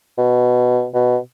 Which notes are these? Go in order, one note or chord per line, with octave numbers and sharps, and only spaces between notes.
B2
B2